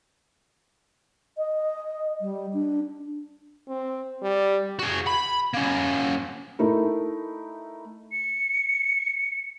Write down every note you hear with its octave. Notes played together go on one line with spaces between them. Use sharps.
D#5
G3
D4
C4
G3
F#4 G#4
B5
A#3 C#4
A3 D#4 E4 A#4
C#7